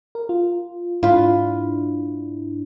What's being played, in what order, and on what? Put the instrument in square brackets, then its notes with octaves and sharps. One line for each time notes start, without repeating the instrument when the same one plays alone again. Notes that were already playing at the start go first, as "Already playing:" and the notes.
[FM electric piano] A#4
F4
[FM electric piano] G#2 D4 E4 [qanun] F4 B4